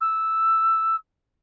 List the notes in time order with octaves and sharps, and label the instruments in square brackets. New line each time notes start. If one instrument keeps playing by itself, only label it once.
[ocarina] E6